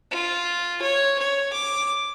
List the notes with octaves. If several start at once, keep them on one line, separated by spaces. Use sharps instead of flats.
F4
C#5
C#5
D6